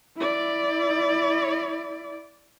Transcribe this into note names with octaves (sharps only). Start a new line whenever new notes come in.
E4 D5